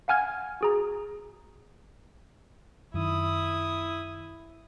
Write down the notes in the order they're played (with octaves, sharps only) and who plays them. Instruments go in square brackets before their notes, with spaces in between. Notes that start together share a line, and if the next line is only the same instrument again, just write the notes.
[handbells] F5 F#5 G#5 F6 G#6
F#4 G#4 A#5
[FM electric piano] F#2 D#3 [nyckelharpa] E4 D#6